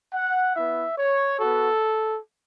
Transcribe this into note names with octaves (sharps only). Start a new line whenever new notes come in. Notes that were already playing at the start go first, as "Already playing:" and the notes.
F#5
B3 E4 E5
C#5
B3 F#4 A4